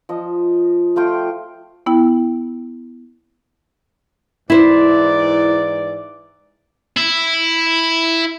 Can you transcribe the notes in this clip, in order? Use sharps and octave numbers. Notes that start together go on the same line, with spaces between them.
F3 D#5
A3 F4 G5
B3 E4 G5
G#2 E3 E4 C5 D5
E4